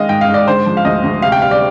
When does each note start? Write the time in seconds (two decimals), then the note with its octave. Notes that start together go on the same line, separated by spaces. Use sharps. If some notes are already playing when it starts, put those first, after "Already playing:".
Already playing: D#3 G#3 D#5 F5
0.09 G#2 G5
0.21 F5
0.28 G#2
0.34 D5
0.47 D3 C5
0.66 F3
0.77 F5
0.85 D2 D#5
1.04 D2
1.22 C3 F5
1.32 G5
1.41 G3 F5
1.51 D5